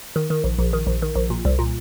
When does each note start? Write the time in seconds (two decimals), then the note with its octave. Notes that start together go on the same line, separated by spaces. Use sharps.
0.16 D#3
0.30 D#3
0.44 A#1
0.59 A#1
0.73 D#3
0.87 A#1
1.02 D#3
1.16 A#1
1.30 A#2
1.45 C2
1.59 A#2